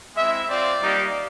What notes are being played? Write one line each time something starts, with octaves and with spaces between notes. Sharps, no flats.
G#3 C4 E4 E5
C4 F4 D5
G3 A#3 D#4 G4